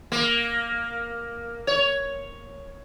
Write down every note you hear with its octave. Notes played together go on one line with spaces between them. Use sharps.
A#3
C#5